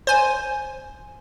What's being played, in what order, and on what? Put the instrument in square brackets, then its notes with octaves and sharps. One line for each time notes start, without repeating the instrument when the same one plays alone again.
[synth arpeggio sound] C5 G#5